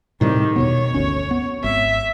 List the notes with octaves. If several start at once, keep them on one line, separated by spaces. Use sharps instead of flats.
A2 C3 D#3 G3 G4
E2 B2 B3 C#5
G1 D2 C#4
B3
G#1 E5